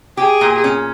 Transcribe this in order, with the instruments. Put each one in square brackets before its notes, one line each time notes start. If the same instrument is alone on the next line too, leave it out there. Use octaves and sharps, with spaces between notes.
[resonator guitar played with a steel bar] G4 [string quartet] G#4
[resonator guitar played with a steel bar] A#2
C#4